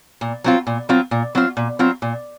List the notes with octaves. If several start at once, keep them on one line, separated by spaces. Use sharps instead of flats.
A#2
F#3 C4 F4
A#2
F#3 C4 F4
A#2
F#3 C4 F4
A#2
F#3 C4 F4
A#2